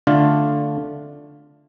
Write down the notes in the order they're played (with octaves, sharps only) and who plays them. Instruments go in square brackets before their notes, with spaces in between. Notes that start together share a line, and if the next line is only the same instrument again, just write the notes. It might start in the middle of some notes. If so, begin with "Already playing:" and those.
[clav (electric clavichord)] D3 A3 D4 F4